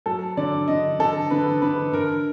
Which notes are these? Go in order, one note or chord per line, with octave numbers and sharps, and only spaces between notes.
F#3 A4
D3 D5
D3 D#5
D3 A4
D3 B4
D3 B4
D3 A#4